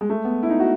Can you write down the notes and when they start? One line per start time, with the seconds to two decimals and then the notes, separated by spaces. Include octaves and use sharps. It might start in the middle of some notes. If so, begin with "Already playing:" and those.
0.01 G#3
0.10 A3
0.25 B3
0.43 E4
0.50 D#4
0.60 F#4